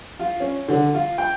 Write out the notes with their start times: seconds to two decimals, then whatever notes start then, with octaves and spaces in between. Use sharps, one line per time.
0.19 F4
0.40 C#4
0.68 D3
0.94 F4
1.18 G5